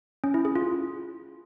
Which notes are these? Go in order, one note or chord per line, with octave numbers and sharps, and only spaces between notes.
C#4
E4
G#4
F4